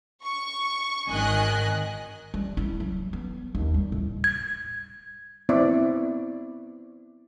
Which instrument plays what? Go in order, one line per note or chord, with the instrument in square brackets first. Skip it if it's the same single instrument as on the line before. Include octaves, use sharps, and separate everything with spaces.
[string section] C#6
G#1 D#3 D#5 G#5 F#6
[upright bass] G3
E4
F#3
B3
D#2
G3
A2
[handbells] G#6
[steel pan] B3 C4 E4 D5